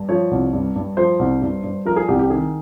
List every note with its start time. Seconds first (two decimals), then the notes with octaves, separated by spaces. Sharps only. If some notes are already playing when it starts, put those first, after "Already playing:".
Already playing: G2
0.09 F3 C#5
0.31 C2
0.53 G2
0.76 G2
0.97 F3 C5
1.19 C2
1.42 G2
1.64 G2
1.85 F3 A#4
1.96 G#4
2.08 C2 G4
2.19 G4
2.30 D#3 G#4